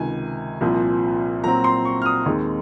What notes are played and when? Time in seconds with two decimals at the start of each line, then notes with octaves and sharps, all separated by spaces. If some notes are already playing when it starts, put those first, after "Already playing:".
Already playing: C#2 C3 D#3 G#5
0.61 C2 A#2 F3 C4
1.44 A#2 F#3 C4 A#5
1.64 C6
1.85 C#6
2.02 F6
2.06 D#6
2.26 D#2 D#3 G#3 C4